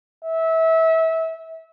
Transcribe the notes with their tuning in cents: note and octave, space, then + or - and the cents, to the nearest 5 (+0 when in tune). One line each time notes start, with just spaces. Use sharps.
E5 -25